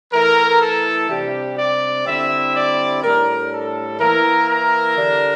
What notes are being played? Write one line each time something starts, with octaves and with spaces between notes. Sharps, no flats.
E3 A3 E4 A#4
A4
C3 G3 D4 G4
D5
D3 G3 C4 E4 E5
D5
A2 G3 D4 A#4
A4
E3 A#3 E4 A#4
A#4
D3 G3 D4